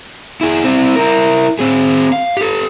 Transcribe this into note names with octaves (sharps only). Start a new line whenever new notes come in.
E4 G#4
C4 E4
E4 A#4
C4 G#4
F5
G4 A4